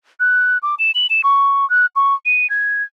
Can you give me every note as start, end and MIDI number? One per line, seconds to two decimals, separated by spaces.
0.20 0.58 90
0.63 0.75 86
0.79 0.91 100
0.95 1.06 102
1.10 1.21 100
1.24 1.68 85
1.70 1.86 90
1.96 2.14 85
2.25 2.50 99
2.50 2.83 92